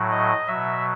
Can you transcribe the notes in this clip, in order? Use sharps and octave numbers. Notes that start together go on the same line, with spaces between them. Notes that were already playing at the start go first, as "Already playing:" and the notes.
Already playing: A2 F#3
D#5
B2 F#3 E5